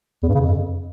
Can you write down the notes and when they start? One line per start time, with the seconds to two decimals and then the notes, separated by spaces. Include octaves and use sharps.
0.23 E2
0.29 G2
0.35 C#3
0.41 F2